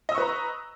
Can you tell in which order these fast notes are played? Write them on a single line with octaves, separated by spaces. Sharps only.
D#5 E6 C#6 B4 A#5